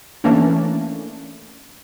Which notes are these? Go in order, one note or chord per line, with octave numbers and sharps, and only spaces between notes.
E3 A3 A#3 C#4 D4